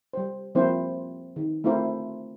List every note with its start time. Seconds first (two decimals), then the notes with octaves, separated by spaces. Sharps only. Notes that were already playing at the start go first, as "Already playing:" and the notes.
0.13 G3 C5
0.55 F3 G3 A#3 C4 E4 C5
1.36 D#3
1.64 A3 C4 E4 F4 A#4 C5